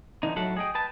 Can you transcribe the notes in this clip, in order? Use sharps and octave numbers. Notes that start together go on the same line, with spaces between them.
D3 E3 D#4
A2 F#3 A4 E5 F#5
G#4 D#5 G5
B4 G5 A5